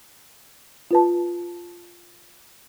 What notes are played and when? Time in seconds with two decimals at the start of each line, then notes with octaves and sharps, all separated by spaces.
0.91 F4 B4 A5